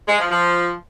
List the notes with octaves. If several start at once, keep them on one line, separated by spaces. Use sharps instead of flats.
G#3
F3
F3